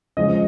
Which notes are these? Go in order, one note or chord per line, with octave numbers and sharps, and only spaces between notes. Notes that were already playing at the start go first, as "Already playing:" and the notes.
C#3 F3 G#3 D#5